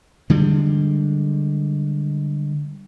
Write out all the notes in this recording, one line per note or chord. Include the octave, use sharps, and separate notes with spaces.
D3 G3 G#3